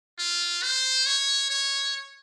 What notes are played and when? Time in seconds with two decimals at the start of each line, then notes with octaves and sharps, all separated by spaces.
0.19 F4
0.63 C5
1.06 C#5
1.50 C#5